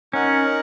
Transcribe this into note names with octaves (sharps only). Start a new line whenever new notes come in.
C#4 D#4 A#4 F#5